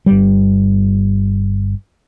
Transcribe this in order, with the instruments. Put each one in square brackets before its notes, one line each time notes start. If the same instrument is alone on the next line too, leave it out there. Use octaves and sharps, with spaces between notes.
[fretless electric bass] G1 G3